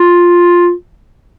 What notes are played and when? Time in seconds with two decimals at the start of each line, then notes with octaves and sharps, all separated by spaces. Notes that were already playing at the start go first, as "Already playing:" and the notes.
Already playing: F4